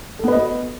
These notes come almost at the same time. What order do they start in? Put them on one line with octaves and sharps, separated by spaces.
A4 B3 B4 D#5 F#4